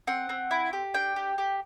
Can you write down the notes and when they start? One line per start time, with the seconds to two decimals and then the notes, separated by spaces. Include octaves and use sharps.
0.07 C4 F#5
0.29 C4
0.51 E4
0.73 G4
0.94 D4 G5
1.16 G4
1.38 G4